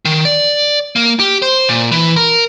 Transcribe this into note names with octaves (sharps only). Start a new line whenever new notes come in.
D#3
D5
A#3
G4
C5
A#2
E3
A#4